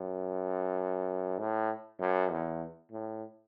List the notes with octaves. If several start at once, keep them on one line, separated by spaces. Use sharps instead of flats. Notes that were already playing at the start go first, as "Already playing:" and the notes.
Already playing: F#2
A2
F#2
E2
A2